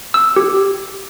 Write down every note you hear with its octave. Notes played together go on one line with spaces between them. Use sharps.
E6
G4